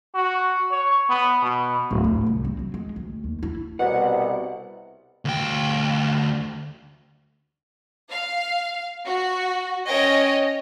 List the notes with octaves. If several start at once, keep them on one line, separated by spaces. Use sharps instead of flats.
F#4
C#5
B3
B2
D1
A2
C2
C4
F#3
G#3
D2
D#2
E4
C2 B2 F#5
D2 G5
F5
F#4
C#4 C#5 D#5 G5